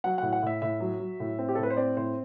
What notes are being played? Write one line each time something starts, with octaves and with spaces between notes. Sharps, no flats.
F#3 F#5
A2 F#5
F#5
A2 E5
A2 E5
F#3
F#3
A2
C4
G4
A4
A2
B4
C5
C4 D5
A2 C5